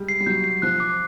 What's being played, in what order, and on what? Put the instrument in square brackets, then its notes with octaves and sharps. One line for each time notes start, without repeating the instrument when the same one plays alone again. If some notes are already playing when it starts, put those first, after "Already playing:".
Already playing: [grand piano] G3 G#3
[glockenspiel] C7
[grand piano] G3
[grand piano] F#3 [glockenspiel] G6
[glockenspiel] C7
[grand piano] F3 [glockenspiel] F#6
[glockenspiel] D6